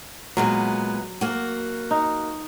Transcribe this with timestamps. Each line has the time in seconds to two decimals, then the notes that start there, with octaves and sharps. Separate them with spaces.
0.37 A#2 F#3 G#3 B3
1.21 A#3 F#4
1.91 D#4